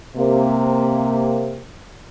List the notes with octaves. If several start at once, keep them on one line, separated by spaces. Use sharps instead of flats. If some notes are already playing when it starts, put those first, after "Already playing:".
C3 A#3